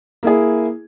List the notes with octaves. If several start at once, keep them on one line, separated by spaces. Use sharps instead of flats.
A#3 E4 G#4